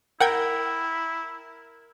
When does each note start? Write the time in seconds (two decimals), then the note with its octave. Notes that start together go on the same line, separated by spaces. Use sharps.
0.20 E4 A#4 F#5 G5 G#6